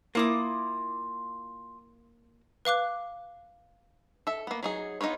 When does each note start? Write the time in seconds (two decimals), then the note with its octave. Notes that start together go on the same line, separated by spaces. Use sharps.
0.15 A#3 E4 F4 D6 D#6
2.65 B4 F5 D6 F#6
4.27 A4 E5
4.47 A#3 B3
4.63 F#3 D#4 G#4
5.01 B3 D#4 F4 B4 C#5